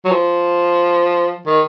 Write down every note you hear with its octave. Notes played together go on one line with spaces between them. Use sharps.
F#3
F3
D#3